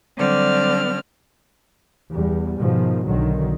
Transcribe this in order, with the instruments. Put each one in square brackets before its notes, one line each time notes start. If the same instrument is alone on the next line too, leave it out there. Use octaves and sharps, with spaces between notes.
[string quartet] D3 F#3 G3 C4 D5 F6
[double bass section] E2 G3
G#2 B2 D#3 F3
B1 D3 D#3 F#3